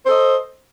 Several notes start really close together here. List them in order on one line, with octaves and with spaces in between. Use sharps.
C5 A4 D#5